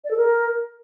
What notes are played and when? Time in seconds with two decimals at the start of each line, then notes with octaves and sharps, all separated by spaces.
0.04 D5
0.11 A4
0.17 A#4